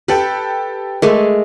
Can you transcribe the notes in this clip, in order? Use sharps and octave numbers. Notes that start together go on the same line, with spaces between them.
G4 A4 B4 G5
G#3 A3 G#4 A#4